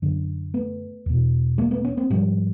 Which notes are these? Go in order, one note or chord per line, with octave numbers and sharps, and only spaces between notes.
F#2 D3
A3 B3
E2 B2
G#3 A#3
A3 B3
B3 C#4
A#3 C4
G#2 F3 G3